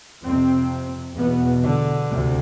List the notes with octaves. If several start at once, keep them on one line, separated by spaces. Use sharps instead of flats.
F2 C3 C4
E2 B2 B3
D3
D2 C3